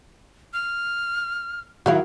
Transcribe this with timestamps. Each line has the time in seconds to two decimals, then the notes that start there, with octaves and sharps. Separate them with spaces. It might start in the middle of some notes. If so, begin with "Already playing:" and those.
0.53 F6
1.86 D#3 F#3 E4 F#4 F5